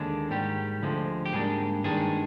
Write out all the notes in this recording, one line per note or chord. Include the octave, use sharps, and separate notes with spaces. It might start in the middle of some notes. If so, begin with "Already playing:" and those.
Already playing: D#2 D3 G#3 D4
G#2 D#3 G3 G4
D2 D3 F3 G#3
G4
G#2 G3 A#3 D4 G#4
G2 D#3 G#3 D4 G#4